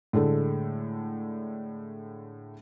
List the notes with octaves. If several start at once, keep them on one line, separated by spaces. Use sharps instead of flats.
A2 D3 G#3 A3